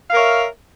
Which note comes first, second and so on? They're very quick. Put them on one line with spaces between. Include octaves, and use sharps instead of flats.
F5 A#4 C#5 E5